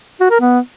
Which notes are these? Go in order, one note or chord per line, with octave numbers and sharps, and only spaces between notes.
F#4
A#4
B3